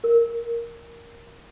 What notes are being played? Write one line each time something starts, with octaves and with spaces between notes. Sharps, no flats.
A#4